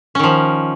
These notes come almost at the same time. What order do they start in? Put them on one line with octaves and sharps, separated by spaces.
C#4 D#3 F3